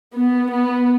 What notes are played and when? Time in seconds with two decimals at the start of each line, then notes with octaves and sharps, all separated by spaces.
0.15 B3
0.52 B3